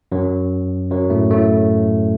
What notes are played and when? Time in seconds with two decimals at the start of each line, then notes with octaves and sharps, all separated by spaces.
0.12 F#2 F#3
0.91 F#2 F#3
1.10 A2 A3
1.30 A2 A3